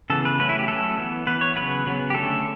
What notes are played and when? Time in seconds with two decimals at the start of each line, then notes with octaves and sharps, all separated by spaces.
0.10 C#3 E3 B3 A4
0.25 B4
0.39 F#3 A3 C#4 B4
0.49 E4
0.59 G4
0.68 F#3 A3 C#4 A4
0.98 E3 B3
1.27 E3 B3 B4
1.41 C#5
1.56 C#3 F#3 B3 B4
1.86 C#3 F#3 B3
2.10 G4
2.15 D3 A3 C#4 A4